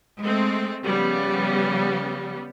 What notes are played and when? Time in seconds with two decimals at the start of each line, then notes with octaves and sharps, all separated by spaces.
0.21 G#3 A3 C4
0.85 C#3 F3 G3 B3